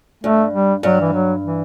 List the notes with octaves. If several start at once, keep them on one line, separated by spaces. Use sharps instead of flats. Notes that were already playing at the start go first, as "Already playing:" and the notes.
G2 A3
G3
G2 F#3
E3
F#3
E3